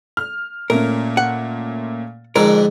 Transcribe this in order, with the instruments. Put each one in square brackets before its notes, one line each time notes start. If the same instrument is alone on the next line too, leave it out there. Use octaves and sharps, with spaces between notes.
[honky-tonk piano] F6
[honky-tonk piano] A#2 A3 C#4 [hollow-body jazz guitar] A#4
[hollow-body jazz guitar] F#5
[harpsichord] F2 G#2 D3 [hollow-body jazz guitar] A#4